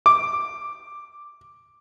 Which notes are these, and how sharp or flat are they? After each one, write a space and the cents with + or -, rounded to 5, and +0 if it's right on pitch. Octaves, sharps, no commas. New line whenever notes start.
D6 +0